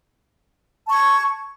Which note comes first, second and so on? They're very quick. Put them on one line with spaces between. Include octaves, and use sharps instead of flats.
A5 C#6 G#6